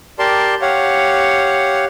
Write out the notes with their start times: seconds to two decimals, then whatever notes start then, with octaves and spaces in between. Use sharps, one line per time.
0.19 G4 A#4 D5 A5 C6
0.62 G4 C#5 F5 F#5